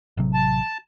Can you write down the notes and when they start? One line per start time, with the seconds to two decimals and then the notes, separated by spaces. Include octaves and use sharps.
0.17 A1 C3 F#3
0.34 A5